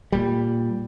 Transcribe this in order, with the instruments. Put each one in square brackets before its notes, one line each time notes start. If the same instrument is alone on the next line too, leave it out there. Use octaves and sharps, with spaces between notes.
[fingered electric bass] A#2 G3